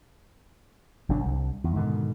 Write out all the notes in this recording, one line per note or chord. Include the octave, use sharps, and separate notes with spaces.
G1 B2 F#3 D4
C2
E2
G#2 B2 D3 D#3